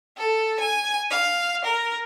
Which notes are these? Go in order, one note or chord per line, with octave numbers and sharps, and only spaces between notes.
A4
G#5
F5
A#4